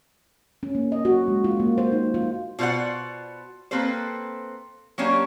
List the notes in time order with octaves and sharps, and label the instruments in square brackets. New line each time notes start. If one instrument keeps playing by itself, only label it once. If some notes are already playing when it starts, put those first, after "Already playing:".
[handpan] C#4
A#3
D#5
F#4
G#3
F4
A#3
C5
D#4
F4
[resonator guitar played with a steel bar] B2 F4 C5 D5 F#5
A#3 C4 A4 B4 C5
F#3 A#3 C#4 D4 G4